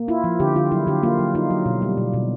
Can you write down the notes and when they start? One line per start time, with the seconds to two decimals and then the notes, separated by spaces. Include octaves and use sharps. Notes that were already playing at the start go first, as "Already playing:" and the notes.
Already playing: A#3
0.08 E4 F4
0.24 F3
0.40 D3 G4
0.56 D3 F4
0.72 F#3 E4
0.87 D3 G4
1.03 A#3 F4
1.19 F#3
1.35 D#4 F4
1.50 F#3
1.66 B2
1.82 G3
1.97 B2
2.13 B2